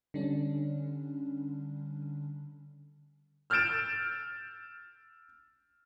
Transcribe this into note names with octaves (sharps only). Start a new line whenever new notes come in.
D3 G3 C#4 D4
E6 F6 G6 A6 D7 E7